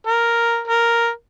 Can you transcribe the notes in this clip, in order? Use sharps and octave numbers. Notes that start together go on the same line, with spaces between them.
A#4
A#4